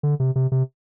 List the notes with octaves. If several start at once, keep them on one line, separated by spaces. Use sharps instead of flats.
D3
C3
C3
C3